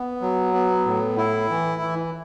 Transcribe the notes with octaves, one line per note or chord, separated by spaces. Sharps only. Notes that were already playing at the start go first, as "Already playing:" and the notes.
Already playing: B3
F#3
B3
A2
E4
E3
E3